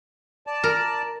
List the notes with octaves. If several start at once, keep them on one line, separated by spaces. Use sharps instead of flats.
D5 A5
A#4